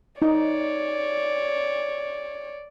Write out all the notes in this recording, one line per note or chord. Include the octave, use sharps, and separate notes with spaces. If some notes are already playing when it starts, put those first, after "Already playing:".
D#4 C#5 D5